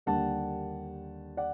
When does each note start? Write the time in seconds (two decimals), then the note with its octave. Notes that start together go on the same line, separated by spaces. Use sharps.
0.06 D#2 D3 G3 A#3 D4 F#5 A5
1.37 D5 F#5